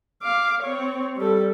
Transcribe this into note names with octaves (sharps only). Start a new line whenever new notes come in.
F5 D6
C4 C#5
G3 A4